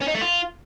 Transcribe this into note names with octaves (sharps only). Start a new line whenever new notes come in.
C#4
D#4
A3
F4